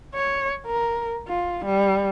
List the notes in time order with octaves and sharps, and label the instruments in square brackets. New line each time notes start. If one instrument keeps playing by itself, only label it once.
[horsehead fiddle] C#5
A#4
F4
G3